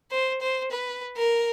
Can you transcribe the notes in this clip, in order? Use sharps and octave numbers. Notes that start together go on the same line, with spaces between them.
C5
C5
B4
A#4